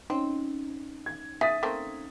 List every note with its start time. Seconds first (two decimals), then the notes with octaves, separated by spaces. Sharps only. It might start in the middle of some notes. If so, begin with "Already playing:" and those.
0.10 C4 C#4 D#4
1.06 G#6
1.41 G#4 E5 D#6 A6 B6
1.63 A3 A#3 C4